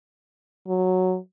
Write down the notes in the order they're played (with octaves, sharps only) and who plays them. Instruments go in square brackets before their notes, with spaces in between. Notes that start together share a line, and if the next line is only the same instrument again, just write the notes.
[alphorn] F#3